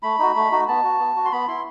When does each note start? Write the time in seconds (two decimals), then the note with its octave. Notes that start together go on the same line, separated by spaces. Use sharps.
0.03 A3 B5
0.19 D#4 F#4
0.35 A3
0.51 D#4 F#4
0.68 B3 A5
0.84 F#4
0.99 B3
1.16 F#4
1.25 C6
1.32 B3 B5
1.48 E4 C6